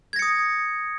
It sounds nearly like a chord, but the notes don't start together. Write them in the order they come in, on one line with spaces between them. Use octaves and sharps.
G#6 A#6 C#7 D#6